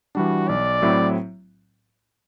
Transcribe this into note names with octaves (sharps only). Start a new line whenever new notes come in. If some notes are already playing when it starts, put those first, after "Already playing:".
E3 G3 D4 F#4
B1 D5
A2 F#3 C4 E4